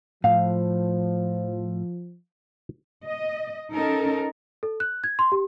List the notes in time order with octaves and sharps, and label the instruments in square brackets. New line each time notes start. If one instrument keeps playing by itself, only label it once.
[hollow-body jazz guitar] A2 [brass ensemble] F3 [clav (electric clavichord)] F5
[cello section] D#5
C#4 D#4 A4 A#4
[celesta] A4
F#6
G#6
C6
G4